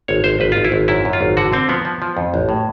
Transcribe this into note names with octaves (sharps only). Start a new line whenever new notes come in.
G#1 C#5
G#1 C5
G#1 B4
G#1 F4
E4
G#1
F#2 E4
F#2
F4
G#1
D3 F#4
D3 C4
F3 B3
F3
F3
F2
A1
A2